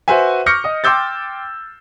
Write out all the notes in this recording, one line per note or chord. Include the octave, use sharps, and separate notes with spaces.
F#4 B4 C5 E5 G#5
C#6 D6 F6 G6 A#6 C#7
D#5 D#6
G5 C6 D6 E6 G6 A6